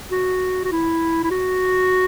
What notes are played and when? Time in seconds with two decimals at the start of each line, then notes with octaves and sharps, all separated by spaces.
0.11 F#4
0.65 F#4
0.72 E4
1.24 E4
1.31 F#4